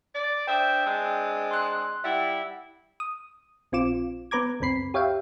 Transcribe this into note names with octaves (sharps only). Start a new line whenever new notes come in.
D5
D4 C5 E5 G5 D#6 G6
G#3 C4 D4
C6 F#6
G3 E4 E5 F#5
D#6
A#1 C4 F4 D6 E7
B3 B4 A#5 D6 G#6
C#2 F#2 C4 B5 C7
G4 C#5 E5 F5 G5